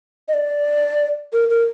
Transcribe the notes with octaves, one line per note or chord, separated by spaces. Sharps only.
D#5
D5
A#4
A#4